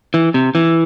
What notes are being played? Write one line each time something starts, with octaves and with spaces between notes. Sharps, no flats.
E3
C3
E3